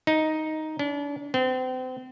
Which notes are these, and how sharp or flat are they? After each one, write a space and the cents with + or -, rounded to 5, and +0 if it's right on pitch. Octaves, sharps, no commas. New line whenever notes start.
D#4 +5
D4 -40
C4 -35